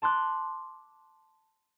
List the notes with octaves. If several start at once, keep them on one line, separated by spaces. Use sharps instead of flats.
A5 C6 D6 F#6